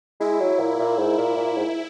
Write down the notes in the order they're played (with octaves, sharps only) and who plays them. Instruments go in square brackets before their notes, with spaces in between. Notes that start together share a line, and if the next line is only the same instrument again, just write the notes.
[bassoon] G#3 [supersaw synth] E4
[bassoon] F#3
A#2
A#2
G#2
A#2
A#2
G#2